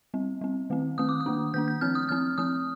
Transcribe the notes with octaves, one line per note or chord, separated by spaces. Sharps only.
G3 C4
G3 C4
D#3 A3 C4
D#3 A3 C4 D#6
D6
D#6
D#3 A#3 D4
D#3 A#3 D4 G6
G6
F3 C4 F6
D#6
F3 C4 F6
F3 C4 D#6